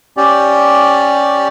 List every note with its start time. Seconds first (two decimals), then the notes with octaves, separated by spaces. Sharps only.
0.17 C#4 G4 D5